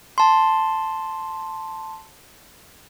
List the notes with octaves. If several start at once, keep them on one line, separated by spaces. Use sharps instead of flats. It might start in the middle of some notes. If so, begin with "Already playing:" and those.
A5 C6